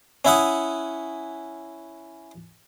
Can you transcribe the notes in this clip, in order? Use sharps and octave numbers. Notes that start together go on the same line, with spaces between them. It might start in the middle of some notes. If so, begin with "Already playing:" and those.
C#4 E4 F#5 D#6